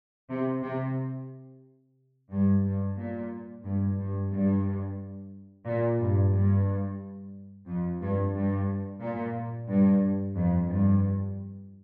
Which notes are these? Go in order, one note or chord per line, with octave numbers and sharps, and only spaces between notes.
C3
C3
G2
G2
A#2
G2
G2
G2
A#2
G2
G2
F2
G2
G2
A#2
G2
F2
G2